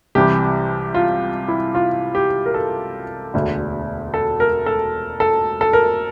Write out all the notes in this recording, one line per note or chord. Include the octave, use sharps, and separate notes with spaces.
C2 C3 E3 G4
F4
E4
F4
G4
A#4
A4
E1 D2 D3
A4
A#4
A4
A4
A4
A#4